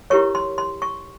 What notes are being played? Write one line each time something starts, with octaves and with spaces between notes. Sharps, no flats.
E4 G4 A#4 C#5 C#6
C6
C6
C#6